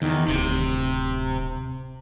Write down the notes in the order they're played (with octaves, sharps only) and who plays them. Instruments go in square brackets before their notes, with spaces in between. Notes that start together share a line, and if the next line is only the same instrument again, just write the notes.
[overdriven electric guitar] E2 [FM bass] D#3
[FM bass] D1 [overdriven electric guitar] C3